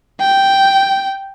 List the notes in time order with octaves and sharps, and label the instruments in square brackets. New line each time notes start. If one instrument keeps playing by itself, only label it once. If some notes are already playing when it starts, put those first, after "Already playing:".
[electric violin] G5